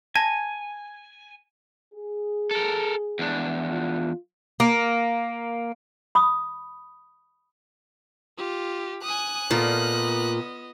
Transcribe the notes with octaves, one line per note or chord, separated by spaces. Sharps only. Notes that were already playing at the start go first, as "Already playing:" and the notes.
G#5 A5 G#6 A#6
G#4
A4 A#4
E2 D4
F4
A#3
B5 D#6
F4 G4
G#5 D#6 F#6
A#2 B3 F4 A4 D#5